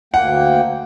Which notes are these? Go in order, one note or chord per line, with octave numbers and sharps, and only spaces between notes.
D2 A#3 F#5 G5